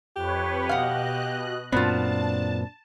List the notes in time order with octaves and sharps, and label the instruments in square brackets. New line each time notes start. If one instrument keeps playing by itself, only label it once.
[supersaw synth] F2 B4 C#5 [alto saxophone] G4
[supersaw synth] B2 D#5 F#6 [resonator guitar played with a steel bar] F5 F#5
[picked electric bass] F#2 A#2 C4 [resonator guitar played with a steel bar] B3 F4 [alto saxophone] D4 [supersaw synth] A5